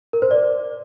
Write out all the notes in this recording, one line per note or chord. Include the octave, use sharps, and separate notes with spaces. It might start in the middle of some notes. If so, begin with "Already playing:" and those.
A#4
C5
D5